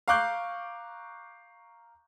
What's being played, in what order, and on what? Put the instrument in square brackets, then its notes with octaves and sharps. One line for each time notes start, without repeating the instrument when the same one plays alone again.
[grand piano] F5 A#5 C#6 D6 F#6 G6